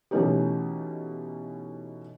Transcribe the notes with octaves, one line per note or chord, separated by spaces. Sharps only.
B2 E3 A3 C#4 D#4 G4